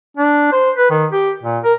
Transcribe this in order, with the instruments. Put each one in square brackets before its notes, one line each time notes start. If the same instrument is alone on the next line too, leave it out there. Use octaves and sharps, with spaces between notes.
[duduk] D4
C5
B4
D#3
G4
A#2
A#4